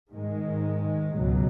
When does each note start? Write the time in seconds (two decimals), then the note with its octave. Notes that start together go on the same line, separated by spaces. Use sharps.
0.10 G#2 D#3 G#3
1.16 C#2 B2 F#3